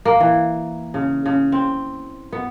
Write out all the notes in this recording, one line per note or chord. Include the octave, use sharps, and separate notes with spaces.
A#3
E3
C#3
C#3
C4
B3